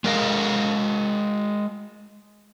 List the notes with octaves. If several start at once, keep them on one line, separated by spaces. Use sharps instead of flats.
G#3 A#4 D#5 F5